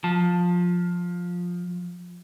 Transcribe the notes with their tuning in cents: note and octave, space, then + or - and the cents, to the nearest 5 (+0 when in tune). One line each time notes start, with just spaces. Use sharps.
F3 +15 A5 +0